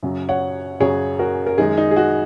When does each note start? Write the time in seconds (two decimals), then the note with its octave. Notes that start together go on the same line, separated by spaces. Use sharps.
0.03 F#2 C#3 F#3
0.29 C#5 F#5
0.80 F#2 C#3 F#3 G#4 C#5
1.19 F#4 A#4
1.47 A#4
1.58 F#2 D#3 G#3 D#4 G#4
1.77 D#4
1.91 G#4
1.97 F#4